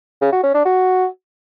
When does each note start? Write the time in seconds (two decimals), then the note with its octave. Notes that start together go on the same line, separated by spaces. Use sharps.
0.21 C#3
0.32 F#4
0.43 C#4
0.54 D4
0.65 F#4